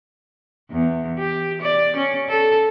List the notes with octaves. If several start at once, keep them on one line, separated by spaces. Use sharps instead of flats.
E2
G4
D5
C#4
A4